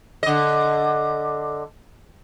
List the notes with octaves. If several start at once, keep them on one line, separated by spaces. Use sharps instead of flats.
D3 D#5